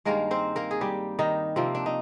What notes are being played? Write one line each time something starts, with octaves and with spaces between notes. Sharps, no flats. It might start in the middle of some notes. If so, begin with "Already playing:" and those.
G2 D#3 G#3 A#3 A#4
C4 C5
A#3 A#4
G#4
G3 G4
D#3 D#4
C3 F3 A#3 C4
D4
D#4